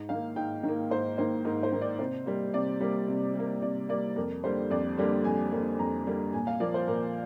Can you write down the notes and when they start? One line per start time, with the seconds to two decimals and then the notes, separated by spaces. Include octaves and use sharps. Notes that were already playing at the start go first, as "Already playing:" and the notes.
Already playing: G#2
0.09 D#3 A#3 F5
0.36 G#2 G5
0.63 D#3
0.68 A#3
0.91 G#2 C5
1.18 D#3 A#3 C5
1.45 G#2 A#4
1.63 C5
1.72 D#3 A#3
1.82 D5
1.99 C3 C5
2.26 G3 A#3
2.53 C3 D5
2.80 G3 A#3
3.08 C3
3.35 G3 A#3
3.62 C3 D5
3.89 G3 A#3 D5
4.16 F2 A#4
4.43 D3 G3 A#3 C5
4.70 F2 D5
4.97 D3 G3 A#3
5.24 F2 G#5
5.52 D3 G3 A#3
5.79 F2 A#5
6.06 D3 G3 A#3
6.33 A#2 G#5
6.47 F5
6.60 F3 A#3 D5
6.74 C5
6.88 A#2 A#4